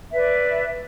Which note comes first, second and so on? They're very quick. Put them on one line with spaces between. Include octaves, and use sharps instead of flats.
E5 B4 D5